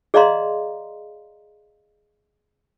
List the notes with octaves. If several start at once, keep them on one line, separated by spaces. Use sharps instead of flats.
G#4 D5 D#5 F5 A#5 C6